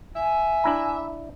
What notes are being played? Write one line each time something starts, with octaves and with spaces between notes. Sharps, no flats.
E5 G#5
D4 E4 A#5